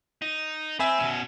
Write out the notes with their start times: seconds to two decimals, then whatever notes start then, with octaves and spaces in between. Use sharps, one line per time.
0.22 D#4
0.80 C4 E5 G#5 B5
1.00 B2 C#4